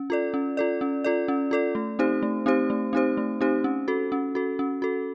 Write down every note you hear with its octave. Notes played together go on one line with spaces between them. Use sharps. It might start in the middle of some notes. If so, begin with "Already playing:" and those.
Already playing: C#4
F4 A4 D5
C#4
F4 A4 D5
C#4
F4 A4 D5
C#4
F4 A4 D5
A3
C4 D#4 G4 C5
A3
C4 D#4 G4 C5
A3
C4 D#4 G4 C5
A3
C4 D#4 G4 C5
C#4
F#4 A4
C#4
F#4 A4
C#4
F#4 A4